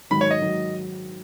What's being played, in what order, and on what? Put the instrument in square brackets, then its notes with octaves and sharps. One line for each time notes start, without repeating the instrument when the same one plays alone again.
[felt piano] G#2 D#3 F#3 [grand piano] B5
[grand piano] C#5
D#5
[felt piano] G#2 D#3 F#3